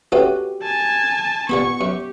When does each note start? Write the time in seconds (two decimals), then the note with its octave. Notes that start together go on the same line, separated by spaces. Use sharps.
0.12 A3 B3 C#4 F#4 G4
0.63 G#5 A5
1.49 A#2 B3 G4 B5 C#6
1.81 F#2 G4